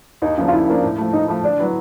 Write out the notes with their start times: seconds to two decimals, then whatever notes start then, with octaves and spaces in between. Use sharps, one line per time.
0.22 D#2 D#4
0.38 C#3 F3 A#3 D4
0.48 F4
0.52 D#2 E4
0.68 C#3 F3 A#3 D4
0.83 A2
0.98 F3 A3
1.13 A2 D#4
1.28 F3 A3
1.44 D3 D4
1.59 F#3 B3 E4